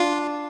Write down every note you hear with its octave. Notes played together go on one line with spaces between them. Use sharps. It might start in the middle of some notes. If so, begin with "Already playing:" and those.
Already playing: D4 F4